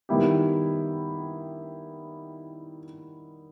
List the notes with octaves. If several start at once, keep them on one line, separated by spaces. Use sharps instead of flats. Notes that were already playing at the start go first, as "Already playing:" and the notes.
D#3 G3 B3 E4 G4